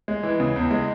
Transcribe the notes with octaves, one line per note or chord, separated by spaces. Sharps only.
G#3
E3
C#3
E2
G#3